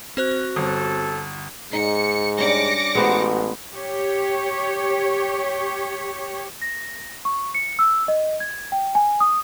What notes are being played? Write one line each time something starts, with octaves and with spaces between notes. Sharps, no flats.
C4 F#4 C5 F#6
G1 A4
G#2 D#4 C#7
G3 C#4 D4 D6 A#6 C#7
A1 G#3 B3 F#4 G4 C5
G4 C#5
A#6
C#6
C#7
E6
D#5
G#6
G5
G#5
D#6